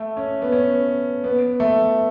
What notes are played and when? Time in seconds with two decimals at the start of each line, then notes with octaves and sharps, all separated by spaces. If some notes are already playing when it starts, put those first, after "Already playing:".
Already playing: A3
0.17 C#4
0.42 B3
0.52 C#4
1.24 B3
1.60 A3